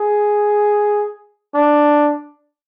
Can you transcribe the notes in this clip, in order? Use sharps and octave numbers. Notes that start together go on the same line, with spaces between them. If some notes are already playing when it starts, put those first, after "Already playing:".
Already playing: G#4
D4